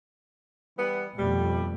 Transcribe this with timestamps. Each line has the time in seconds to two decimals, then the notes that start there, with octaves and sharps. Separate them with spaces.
0.77 E3 G3 B3
1.17 F2 B2 G3 A3